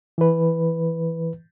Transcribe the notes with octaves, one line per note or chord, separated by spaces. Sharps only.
E3 B4